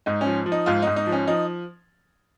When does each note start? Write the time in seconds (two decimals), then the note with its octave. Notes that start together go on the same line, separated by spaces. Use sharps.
0.06 G#2 D#4
0.21 C#4
0.26 F3
0.46 F3
0.52 D#4
0.66 G#2 F4
0.82 G#2 D#4
0.96 D#4
1.07 F3
1.12 C#4
1.27 F3 D#4